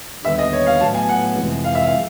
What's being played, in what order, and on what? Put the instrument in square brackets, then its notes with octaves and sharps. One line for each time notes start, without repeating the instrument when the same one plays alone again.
[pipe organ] D#2 D3 G3 B3 [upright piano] E5
[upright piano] D#5
C#5
F5
[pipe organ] A2 F#3 B3 [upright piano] A5
[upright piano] G#5
F#5
[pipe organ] F2 C3 E3 G#3
[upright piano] F5
E5
F5